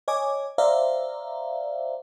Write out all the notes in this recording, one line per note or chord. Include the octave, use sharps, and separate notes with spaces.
C#5 D#5 G#5 D6
C5 D5 E5 F5 A#5